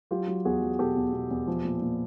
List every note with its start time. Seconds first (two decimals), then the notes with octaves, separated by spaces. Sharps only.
0.11 F#3 F4 G4
0.27 F#3
0.45 E2 F#4 G#4
0.62 F#3
0.79 B2 G4 A4
0.96 E2
1.13 B2
1.31 E2
1.47 F3
1.64 A#2
1.82 A#2